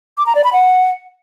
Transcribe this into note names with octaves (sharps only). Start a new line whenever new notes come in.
D6
A#5
D5
B5
F#5